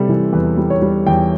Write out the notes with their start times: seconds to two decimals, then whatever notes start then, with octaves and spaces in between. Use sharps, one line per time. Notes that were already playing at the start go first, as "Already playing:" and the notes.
Already playing: C3 G3 A4
0.09 E3
0.33 E2 B4
0.57 G3
0.70 C#5
0.82 G3
1.07 E2 G5